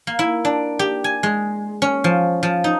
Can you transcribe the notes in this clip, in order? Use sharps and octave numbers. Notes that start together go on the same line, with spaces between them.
A#3
E4
D4
G4
G#5
G#3
C#4
F3
F3
D#4